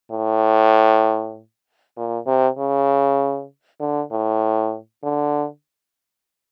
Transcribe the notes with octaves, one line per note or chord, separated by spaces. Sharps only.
A2
A#2
C3
C#3
D3
A2
D3